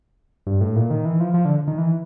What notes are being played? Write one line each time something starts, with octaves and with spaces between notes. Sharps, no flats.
G2
A2
A#2
D#3
E3
F3
F3
D3
D#3
E3